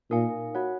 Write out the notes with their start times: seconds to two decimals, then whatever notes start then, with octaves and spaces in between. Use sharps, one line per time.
0.11 A#2 D#4 A#4 F5 G#5
0.55 F#4 C#5 F#5